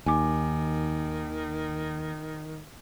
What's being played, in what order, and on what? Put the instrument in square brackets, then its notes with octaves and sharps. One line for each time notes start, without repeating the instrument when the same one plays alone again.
[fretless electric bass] D#2 [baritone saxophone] D#3 [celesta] G#5 D6